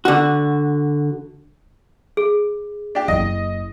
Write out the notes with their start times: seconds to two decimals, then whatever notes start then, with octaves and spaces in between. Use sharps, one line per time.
0.05 D3 F#4
2.17 G#4
2.95 D4 G4
3.08 F#1 E4 D#5